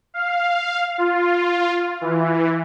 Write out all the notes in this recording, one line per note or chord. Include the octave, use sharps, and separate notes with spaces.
F5
F4
E3